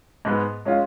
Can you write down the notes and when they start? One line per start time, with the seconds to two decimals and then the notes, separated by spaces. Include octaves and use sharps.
0.25 G#2 G#3 B3
0.65 G#3 C#4 F4